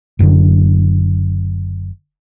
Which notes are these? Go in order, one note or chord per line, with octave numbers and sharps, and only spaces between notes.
F#1 F#2 B2 D3